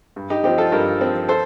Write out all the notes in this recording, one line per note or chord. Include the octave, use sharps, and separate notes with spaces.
G2
D#4 G4
F3 C4 D#4 G4
F4 A4
G2 G4 A#4
F3 C4
A4 C5